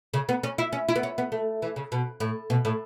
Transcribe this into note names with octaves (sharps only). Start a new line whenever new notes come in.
C#3
B3
C#4
E4
C#4
E4
B3
C#4
B3
A3
E3
C#3
B2
A2
B2
A2